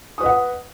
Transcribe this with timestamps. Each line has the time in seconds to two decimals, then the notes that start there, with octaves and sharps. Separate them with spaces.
0.18 D#6
0.21 B4
0.23 D#5
0.26 F#5